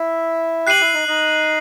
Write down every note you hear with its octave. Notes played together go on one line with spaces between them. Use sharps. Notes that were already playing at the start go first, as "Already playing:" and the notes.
Already playing: E4 E5
G4 G5 F#6 C7 D#7 F#7
E4 E5
D#4 D#5
D#4 D#5